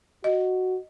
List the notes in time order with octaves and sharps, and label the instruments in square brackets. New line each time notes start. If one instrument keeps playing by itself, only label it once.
[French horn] F#4 [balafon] D#5